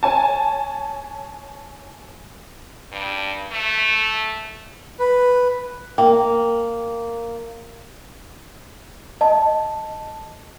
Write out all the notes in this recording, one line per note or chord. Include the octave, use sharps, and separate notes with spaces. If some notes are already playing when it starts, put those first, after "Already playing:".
C#5 G#5 A5
G2
A3
B4
A#3 G5
D#5 A5